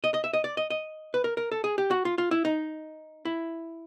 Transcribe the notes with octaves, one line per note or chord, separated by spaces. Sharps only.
D#5
D#5
E5
D#5
D5
D#5
D#5
B4
A#4
A#4
A4
G#4
G4
F#4
F4
F4
E4
D#4
E4